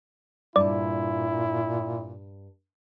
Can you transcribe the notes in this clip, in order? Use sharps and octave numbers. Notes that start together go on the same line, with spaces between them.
G2 A#2 E4 D5 A5